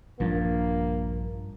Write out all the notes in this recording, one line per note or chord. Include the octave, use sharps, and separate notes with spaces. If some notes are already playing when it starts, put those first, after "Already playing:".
A#1 G2 F3 A#3 D4